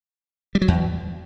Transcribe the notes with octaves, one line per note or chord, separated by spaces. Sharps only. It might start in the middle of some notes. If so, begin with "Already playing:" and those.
G3
F#3
E2